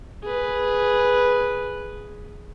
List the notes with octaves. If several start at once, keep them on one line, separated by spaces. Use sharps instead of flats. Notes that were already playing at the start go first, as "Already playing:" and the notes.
G#4 B4